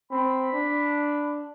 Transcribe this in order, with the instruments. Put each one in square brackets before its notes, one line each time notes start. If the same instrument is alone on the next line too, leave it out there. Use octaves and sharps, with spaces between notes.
[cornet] C4 [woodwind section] B5
[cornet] D4